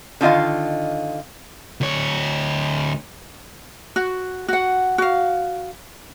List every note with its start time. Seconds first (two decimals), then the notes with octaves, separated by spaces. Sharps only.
0.21 D3 D#3 F4 D#5 F5
1.81 D2 C#5
3.96 F#4
4.48 F#4 F#5
4.98 F#4 F5